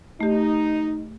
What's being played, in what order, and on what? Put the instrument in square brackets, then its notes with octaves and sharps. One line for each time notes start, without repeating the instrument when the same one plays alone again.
[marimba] A3 G4 [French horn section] D#4